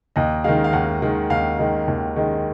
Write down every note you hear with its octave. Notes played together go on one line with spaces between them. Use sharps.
D#2 D#5
D#3 G#3 F5
F5
D#2 F#5
D#3 G#3
D#2 F5
D#3 G#3
D#2
D#3 G#3